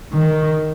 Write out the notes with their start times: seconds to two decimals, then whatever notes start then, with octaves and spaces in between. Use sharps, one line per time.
0.13 D#3